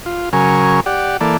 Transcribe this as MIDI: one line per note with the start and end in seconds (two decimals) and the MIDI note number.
0.06 0.29 65
0.33 0.80 49
0.33 0.80 54
0.33 0.80 70
0.33 0.80 80
0.33 0.80 85
0.86 1.17 67
0.86 1.17 74
0.86 1.17 78
1.21 1.37 52
1.21 1.37 58
1.21 1.37 69
1.21 1.37 74